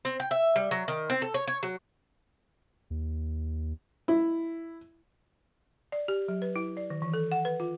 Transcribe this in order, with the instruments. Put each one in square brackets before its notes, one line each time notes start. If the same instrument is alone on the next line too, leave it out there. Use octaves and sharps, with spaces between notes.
[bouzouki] C4
G5
E5
G3
F#3
D#3
C4
A4
C#5
C#5
F#3
[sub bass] D#2
[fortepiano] E4
[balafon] D5
G4
F#3
B4
E4
D5
D#3
E3
A4
F#5
B4
F4